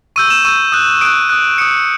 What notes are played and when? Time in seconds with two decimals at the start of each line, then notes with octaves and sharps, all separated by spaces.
0.16 C#6 E6 G6 D#7
0.30 E7
0.45 C#6 E6 G6 D#7
0.72 D#6 F#6
1.01 D#6 F#6 D7
1.29 D#6 F#6
1.58 D#6 F#6 C#7